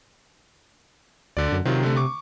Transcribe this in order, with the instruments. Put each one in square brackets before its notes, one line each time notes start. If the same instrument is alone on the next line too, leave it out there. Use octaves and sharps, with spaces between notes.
[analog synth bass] D2 [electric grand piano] D3 D5
[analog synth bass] F#2
[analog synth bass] C3 [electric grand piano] D#3 F#3 F4
[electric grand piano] D3 A3
C#6 D6